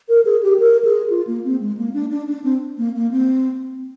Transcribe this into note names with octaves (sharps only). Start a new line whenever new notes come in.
A#4
G#4
G4
A#4
G#4
F4
A#3
C4
G#3
A#3
D4
D4
D4
C4
A#3
A#3
C4